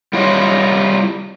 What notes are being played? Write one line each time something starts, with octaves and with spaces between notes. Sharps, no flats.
G3 E4 F4 C#5 D#5